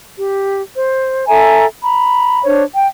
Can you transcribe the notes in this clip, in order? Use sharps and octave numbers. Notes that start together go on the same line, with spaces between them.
G4
C5
A4 E5 G#5 A#5
A#5 B5
D4 C5 C#5
G5